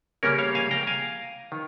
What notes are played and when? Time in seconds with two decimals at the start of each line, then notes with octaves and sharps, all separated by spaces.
0.23 C#3 G3 A#3 C#4 A#4 C#5
0.38 C#5 F5
0.55 F5 G#5
0.71 G5 A#5
0.87 F5 G#5
1.52 D#3